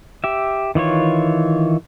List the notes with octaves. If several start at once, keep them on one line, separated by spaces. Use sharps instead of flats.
G4 E5
D#3 E3 F4 C#5